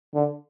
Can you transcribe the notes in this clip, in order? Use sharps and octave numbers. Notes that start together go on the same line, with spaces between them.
D3